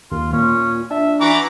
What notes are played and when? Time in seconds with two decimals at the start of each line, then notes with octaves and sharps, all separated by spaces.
0.12 D#2 F4
0.33 A#2 C#4
0.91 D4 E5
1.21 E3 F#4 A#5 D6